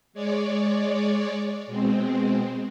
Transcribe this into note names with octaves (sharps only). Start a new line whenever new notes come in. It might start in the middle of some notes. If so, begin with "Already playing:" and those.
G#3 C#5 D5
B2 G#3 C4